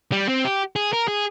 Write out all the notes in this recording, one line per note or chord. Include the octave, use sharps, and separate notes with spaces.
G3
C4
G4
G#4
A#4
G#4